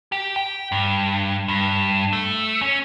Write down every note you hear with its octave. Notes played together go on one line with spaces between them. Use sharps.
G4
G5
G2
G2
A3
C#4